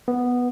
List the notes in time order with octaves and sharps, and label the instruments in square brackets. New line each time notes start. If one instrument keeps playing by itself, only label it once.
[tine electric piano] B3